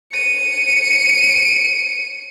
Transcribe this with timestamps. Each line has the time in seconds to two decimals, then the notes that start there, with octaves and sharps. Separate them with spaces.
0.13 C#7 D#7